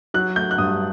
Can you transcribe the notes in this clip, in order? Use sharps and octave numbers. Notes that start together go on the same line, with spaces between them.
F#3 F#6
A3 G6
F#6
G2 D#6